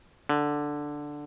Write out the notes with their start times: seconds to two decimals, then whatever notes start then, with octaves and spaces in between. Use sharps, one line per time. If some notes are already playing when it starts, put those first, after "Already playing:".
0.29 D3